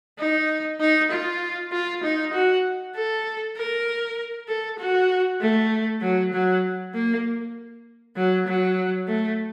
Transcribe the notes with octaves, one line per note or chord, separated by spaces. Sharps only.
D#4
D#4
F4
F4
D#4
F#4
A4
A#4
A4
F#4
A3
F#3
F#3
A#3
F#3
F#3
A3